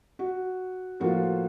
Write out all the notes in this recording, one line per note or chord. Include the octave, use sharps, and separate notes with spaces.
F#4
A2 F3 A#3 F4 F#4